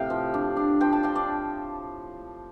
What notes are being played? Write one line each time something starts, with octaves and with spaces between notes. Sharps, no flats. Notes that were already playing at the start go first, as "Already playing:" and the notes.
Already playing: A2 C3 F5 G5
F3
D4
D4
F3 G5
A5
D4 G5
D5